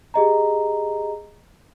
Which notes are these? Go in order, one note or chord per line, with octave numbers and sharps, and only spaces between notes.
G4 G#4 D#5 A#5